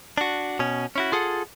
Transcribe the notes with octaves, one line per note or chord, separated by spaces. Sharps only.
D4 F#4
B2 C#4
C#4 E4 F#4
F4 G#4 A4 F#5